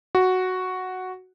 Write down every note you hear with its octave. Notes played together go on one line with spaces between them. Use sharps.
F#4